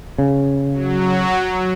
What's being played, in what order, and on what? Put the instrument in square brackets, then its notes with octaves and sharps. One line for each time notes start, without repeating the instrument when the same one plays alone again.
[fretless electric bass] C#3
[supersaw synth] F#3